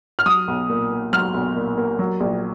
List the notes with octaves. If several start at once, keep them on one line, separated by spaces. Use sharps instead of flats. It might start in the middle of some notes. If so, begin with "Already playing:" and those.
F6
F#3 D#6
B1
A#2
A#3
F#3 F6
B1
A#2
A#3
F#3
A#1